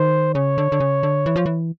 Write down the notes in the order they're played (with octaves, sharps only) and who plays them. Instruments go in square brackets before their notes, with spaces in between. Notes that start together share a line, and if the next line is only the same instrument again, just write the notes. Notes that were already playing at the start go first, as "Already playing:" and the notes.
Already playing: [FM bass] D#3 [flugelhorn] C5
[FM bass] C#3 [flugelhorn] C#5
[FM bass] D3
D3
C#3
D3
E3
F3
E3